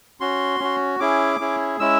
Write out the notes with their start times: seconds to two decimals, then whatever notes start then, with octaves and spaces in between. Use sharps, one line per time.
0.20 C#4 F#4 C6
0.60 C#4 F#4
1.00 C#4 E4 G#4 D6
1.40 C#4 E4 G#4
1.79 G#3 C#4 E4 E6